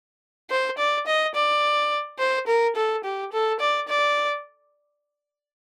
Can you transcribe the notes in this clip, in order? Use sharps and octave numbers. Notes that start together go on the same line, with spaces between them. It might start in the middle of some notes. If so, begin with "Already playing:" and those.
C5
D5
D#5
D5
C5
A#4
A4
G4
A4
D5
D5